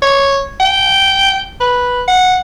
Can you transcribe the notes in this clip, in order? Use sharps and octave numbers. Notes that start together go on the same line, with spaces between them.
C#5
G5
B4
F#5